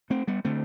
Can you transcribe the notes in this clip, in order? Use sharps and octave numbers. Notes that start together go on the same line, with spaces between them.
A3 C4
G3 B3
D3 A3 C4